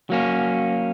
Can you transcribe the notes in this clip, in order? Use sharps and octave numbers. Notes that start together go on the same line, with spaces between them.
F#3 A#3 C#4